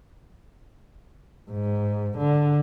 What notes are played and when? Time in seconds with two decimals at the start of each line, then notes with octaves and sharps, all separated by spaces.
1.51 G#2
2.17 D3